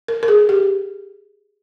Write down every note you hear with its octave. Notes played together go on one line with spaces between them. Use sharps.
A#4
A#4
G#4
G4